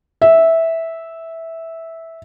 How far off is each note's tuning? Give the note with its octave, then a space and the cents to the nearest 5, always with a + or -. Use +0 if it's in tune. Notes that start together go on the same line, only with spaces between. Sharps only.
E5 -10